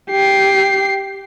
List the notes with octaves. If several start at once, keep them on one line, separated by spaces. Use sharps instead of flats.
G4 C7